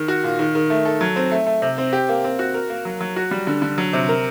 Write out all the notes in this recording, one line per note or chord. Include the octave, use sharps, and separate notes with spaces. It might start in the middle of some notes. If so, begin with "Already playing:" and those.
Already playing: D#3
F#4
A#2
D#3
D#3
A3
A4
F#3
C4
A3
A3
C3
C4
G4
A#3
C4
F#4
A#4
A#3
F#3
F#3
F#4
G3
D3
D3
F#3
C3
A#4